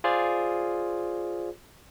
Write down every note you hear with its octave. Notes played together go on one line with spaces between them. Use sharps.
F4 G#4 C5 D5